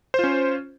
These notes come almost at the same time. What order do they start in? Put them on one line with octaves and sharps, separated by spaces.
C5 F4 C#4